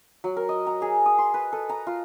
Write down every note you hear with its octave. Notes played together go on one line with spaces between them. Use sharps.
F#3
A#4
D#5
A#5
G#4
D#6
C6
B4
A4
A#5
F4